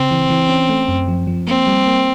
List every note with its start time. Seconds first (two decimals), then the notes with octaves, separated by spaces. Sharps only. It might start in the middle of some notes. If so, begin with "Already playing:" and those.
Already playing: C#3 C4
0.11 E3
0.30 E3
0.49 C#4
0.69 A3
0.88 F#2
1.08 F3
1.27 F3
1.47 A#3 C4
1.67 G3
1.87 A#3